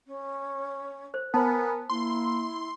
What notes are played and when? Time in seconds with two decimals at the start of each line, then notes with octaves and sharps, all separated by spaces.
0.06 C#4
1.14 C5
1.34 B3 A#4 C5 G#5 A5
1.90 A#3 E4 C6